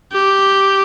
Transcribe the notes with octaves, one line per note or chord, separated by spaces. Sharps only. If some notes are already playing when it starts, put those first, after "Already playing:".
G4